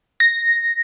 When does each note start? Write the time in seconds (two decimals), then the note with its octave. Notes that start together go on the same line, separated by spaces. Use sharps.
0.20 A#6